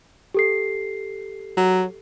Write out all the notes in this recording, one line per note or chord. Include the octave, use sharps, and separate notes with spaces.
G4 A4 C7
F#3